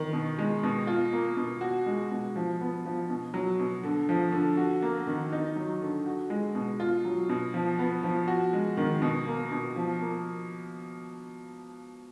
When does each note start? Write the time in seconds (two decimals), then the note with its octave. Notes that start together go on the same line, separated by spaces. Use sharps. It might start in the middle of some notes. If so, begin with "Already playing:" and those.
Already playing: D#3
0.13 B2
0.38 G#3
0.63 B2
0.87 F4
1.13 A#3
1.37 B2
1.61 F#4
1.86 G#3
2.11 B2
2.36 F3
2.61 B3
2.85 F3
3.10 B2
3.34 F#3
3.59 B2
3.83 D3
4.09 F3
4.33 D3
4.57 F#4
4.82 A#3
5.07 D#3
5.32 D#4
5.56 F#3
5.82 D3
6.06 F#4
6.30 G#3
6.55 B2
6.80 F4
7.05 F#3
7.29 B2
7.54 F3
7.79 B3
8.03 F3
8.28 F#4
8.53 G#3
8.77 D#3
9.02 B2
9.27 A#3
9.52 B2
9.76 F3
10.01 A#3